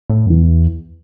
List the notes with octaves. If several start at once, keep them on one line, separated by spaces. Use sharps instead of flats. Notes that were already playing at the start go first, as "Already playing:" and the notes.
A2
F#2
E2 E3